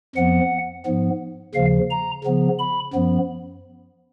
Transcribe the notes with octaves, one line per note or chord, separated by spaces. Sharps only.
F2 F3 B3 F#5
G#2 F3 B3
D#2 C#3 F3 F5
A#5
C#3 F3 B3
B5
F#2 F3 B3